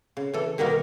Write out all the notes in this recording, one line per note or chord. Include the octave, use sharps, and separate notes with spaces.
C#3
E3 A4
B2 D#3 G3 A#3 B3 A#4